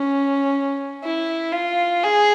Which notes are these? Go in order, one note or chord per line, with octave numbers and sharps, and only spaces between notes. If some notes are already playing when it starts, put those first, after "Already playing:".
Already playing: C#4
E4
F4
G#4